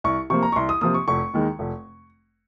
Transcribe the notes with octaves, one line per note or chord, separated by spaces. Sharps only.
C2 C#6
C3 F3 A#3 C#6
A#5
C#6
C2 C6
D#6
C3 F3 A#3 D#6
C#6
F1 C#6
D#2 D#3 G#3
F1